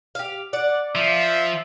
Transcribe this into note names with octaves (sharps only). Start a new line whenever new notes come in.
G4 F5
D5 F#5
F3 E5